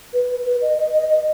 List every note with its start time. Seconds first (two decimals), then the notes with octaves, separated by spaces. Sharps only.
0.14 B4
0.46 B4
0.62 D#5
0.78 D#5
0.93 D#5
1.10 D#5